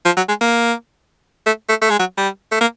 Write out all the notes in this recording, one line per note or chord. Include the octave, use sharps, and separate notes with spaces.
F3
F#3
G#3
A#3
A3
A3
A3
G#3
F#3
G3
A3
A#3